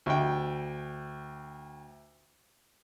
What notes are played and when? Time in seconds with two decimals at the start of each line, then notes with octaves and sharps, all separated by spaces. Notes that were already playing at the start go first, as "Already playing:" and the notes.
0.06 D2 G5